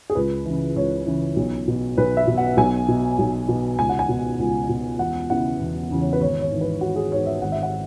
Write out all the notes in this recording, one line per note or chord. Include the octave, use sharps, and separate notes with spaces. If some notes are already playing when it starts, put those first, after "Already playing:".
G#4
C#2 B4
C#3 E3
C#2 C#5
C#3 E3
B1
B2
B1 B4
E5
B2
F#5
B1 G#5
B2
B1
B2
C#2 G#5
F#5
G#5
B2
C#2
B2
E1 F#5
E2 C#3 E3 F#5
E1
E2 C#3 E3
C#5
B4
G#1 C#5
C#5
G#2 E3
B4
G#1 F#4
G#4
G#2 E3 C#5
E5
G#1 F#5
E5
F#5